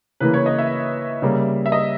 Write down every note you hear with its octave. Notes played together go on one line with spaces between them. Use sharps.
C#3 E3 A#3 B4
C#5
D#5
E5
C#3 G3 A#3
E5
D#5